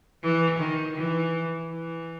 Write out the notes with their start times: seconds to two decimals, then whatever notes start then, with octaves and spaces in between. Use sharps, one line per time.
0.23 E3
0.59 D#3
0.96 E3
1.70 E3